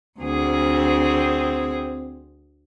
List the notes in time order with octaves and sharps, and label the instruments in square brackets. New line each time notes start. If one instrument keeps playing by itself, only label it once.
[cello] D2 G#4 [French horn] C4